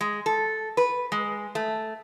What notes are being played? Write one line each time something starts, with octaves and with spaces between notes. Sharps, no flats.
G#3
A4
B4
G#3
A3